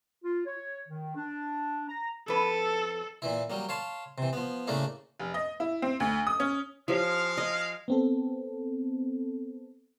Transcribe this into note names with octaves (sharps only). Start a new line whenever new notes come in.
F4
C#5
D#3
D4
A#5
F2 A4 B4
A#2 E3 E4
F#3 G3 A#3
C#5 F5 A5 C6
C3 E3
F3 B3
A2 C#3 A3 A#3 D4 E4
F1
D#5
E4
C4
D2
D#6
C#4
F3 G#3 E4 G4 C#5 F5
D#5
B3 C4 A4